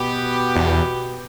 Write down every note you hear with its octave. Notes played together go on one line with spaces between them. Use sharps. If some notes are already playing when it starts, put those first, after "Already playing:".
Already playing: B2 B3 G4
E2